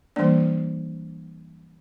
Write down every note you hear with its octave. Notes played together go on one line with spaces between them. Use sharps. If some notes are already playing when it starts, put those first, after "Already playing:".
E3 G3 A#3 D4 D5